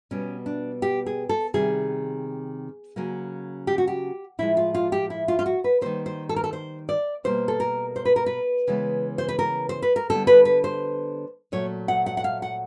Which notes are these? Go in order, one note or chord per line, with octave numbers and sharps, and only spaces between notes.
B2 G3 B3 C#4
D4
G4
G#4
A4
C3 D#3 G3 G#4
C#3 F#3 A#3
G4
F#4
G4
A2 F3 G#3 E4
F4
F4
G4
E4
F4
F4
F#4
B4
D#3 G3 A#3 C5
C5
A4
A#4
A4
C5
D5
B2 G3 A#3 C5
A4
A#4
C5
B4
A#4
B4
C#3 E3 G#3 B3
C5
B4
A#4
C5
B4
A#4
D3 G3 B3 A4
B4
B4
C5
A#2 F#3 A3 C#5
F#5
F#5
F#5
F5
F#5